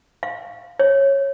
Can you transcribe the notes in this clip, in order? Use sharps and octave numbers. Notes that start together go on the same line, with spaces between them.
F5
C#5